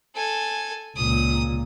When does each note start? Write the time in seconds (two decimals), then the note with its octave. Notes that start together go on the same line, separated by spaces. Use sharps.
0.16 A4 G#5
0.97 C#2 A#2 D#6